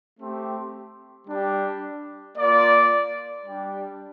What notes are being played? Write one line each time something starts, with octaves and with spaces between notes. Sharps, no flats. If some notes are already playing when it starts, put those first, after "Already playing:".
A3 C4 G4
G3 D4 G4
A#3 F4 D5
G3 D4 G4